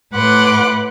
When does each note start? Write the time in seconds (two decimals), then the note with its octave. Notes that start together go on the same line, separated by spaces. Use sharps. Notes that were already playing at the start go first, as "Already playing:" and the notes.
0.13 A2 B4 F#5 C6 D6